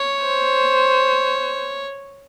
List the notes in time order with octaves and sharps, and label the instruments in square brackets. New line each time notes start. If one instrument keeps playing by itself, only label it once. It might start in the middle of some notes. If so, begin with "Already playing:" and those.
Already playing: [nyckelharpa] C#5
[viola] C5